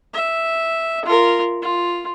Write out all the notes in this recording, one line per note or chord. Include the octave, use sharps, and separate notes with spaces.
E5
F4 A#4
F4